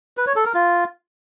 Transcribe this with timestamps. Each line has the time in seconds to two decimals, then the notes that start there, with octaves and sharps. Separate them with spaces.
0.17 B4
0.27 C#5
0.36 A4
0.45 A#4
0.54 F4